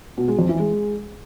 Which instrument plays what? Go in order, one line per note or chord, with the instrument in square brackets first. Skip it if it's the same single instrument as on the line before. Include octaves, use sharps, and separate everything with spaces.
[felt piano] B2
G#3
F2
E3
G#3